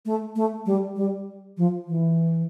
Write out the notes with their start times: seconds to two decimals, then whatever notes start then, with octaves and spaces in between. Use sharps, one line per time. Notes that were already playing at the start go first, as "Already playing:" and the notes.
0.06 A3
0.36 A3
0.66 G3
0.96 G3
1.57 F3
1.88 E3